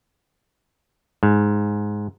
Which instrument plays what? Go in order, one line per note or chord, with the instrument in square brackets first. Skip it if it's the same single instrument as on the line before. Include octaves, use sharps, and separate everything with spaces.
[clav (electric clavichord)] G#2